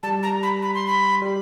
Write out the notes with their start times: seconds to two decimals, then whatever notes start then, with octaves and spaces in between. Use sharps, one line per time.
0.03 G3 A5
0.23 A#5
0.43 B5
0.62 B5
0.75 C6
0.87 B5
1.21 G3